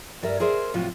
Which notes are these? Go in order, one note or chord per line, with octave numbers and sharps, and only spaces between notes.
G2 G3 A#4 E5
G#4 A#4 C5 D5 E5
A2 C3 F3 F#3 F4